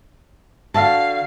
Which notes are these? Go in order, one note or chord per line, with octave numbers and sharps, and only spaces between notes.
D3 F#4 F5 A5